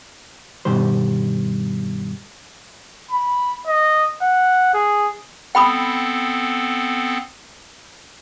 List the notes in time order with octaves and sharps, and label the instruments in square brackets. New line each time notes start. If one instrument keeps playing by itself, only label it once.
[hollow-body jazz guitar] G2 B2 D#3 G3 C5
[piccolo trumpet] B5
D#5
F#5
G#4
[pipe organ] B3 C4 A4 [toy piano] G5 B5 D#6